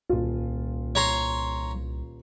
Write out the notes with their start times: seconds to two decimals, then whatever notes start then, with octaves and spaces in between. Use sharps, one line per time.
0.09 D#1 C2 F4
0.95 C#5 A#5 C6